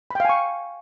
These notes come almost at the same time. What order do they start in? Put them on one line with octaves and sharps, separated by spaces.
B5 G5 F5 G#5 C#6